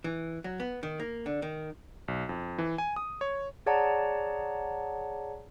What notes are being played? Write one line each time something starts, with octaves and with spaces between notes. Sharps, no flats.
E3
F#3
B3
D#3
A#3
D3
D#3
B1
F2
E3
G#5
D#6
C#5
G#4 C#5 D5 F#5 A5 A#5